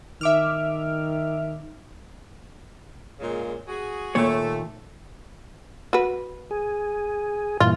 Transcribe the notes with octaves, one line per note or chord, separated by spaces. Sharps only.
D#3 E5 D6 F6
A#2 C#3 G#3
F#4 G#4
D#2 A#2 A3 C#5
F#4 B4
G#4
G2 A#2 E3 F4